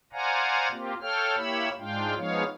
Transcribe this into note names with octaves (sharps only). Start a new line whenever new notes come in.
C5 D5 F5 F#5 G#5 A#5
A#3 C4 F4 G4
A4 C#5 F5 G5 F6
A#3 E4 G4 C#5 B5 E6
G#2 G#3 D4 F4 F5 G5
F3 G#3 B3 D#4 C#5 F5